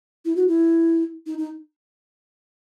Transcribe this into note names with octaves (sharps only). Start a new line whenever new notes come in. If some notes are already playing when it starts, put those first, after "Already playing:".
E4
F#4
E4
D#4
D#4